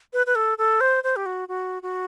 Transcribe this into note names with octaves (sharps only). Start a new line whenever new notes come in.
B4
B4
A4
A4
C5
C5
G4
F#4
F#4
F#4